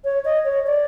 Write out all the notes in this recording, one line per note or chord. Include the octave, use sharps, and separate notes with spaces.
C#5
D#5
C#5
D5